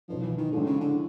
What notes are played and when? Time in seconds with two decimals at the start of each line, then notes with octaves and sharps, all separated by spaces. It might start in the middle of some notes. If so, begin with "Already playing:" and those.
0.08 B2 F3 F#3 B3 D#4
0.23 E3
0.38 D#3
0.52 A2 D3 F3 G#3
0.66 C#3
0.81 D3